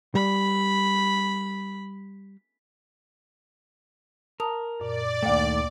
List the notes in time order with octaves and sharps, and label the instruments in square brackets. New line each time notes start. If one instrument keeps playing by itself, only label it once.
[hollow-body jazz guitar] G3 [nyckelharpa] B5
[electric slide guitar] A#4 [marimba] A5 A#5 D#6
[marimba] F#2 A#2 [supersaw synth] D5
[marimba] D2 A#3 G5 [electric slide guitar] D#3 A3